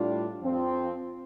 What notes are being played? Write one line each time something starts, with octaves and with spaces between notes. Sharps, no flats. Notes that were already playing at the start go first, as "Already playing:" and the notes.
Already playing: A2 G3 D4 F4
F2 F3 C4 F4